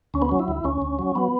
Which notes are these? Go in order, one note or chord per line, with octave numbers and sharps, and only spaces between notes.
D2 C#4
B3
F#3 C#4
E4
D2
D2 C#4
D2
F#3
F#3 B3